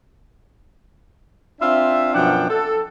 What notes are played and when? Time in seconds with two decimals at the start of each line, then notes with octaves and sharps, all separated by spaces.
1.61 C4 D4 F4 E5
2.14 F#2 B2 F3 D4 F#5 G5
2.50 A4